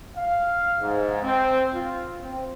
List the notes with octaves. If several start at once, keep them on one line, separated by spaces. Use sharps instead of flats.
F5
G#2
C4
F4
C4